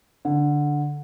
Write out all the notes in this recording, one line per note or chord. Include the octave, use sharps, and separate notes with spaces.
D3